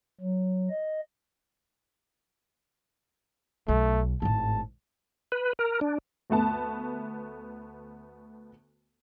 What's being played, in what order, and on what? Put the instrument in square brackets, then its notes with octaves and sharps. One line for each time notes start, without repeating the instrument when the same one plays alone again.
[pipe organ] F#3
D#5
[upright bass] B1 [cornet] A3
[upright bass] G#1 A2 [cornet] A5
[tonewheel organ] B4
A#4
D4
[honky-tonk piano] D2 A3 B3 A5